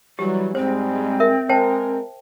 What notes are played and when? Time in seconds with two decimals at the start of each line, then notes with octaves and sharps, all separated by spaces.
0.19 E3 F#3 G3 G4
0.55 G#2 G3 G#3 C4 C5
1.20 A#4 E5
1.49 G#3 A#4 C5 G5 A5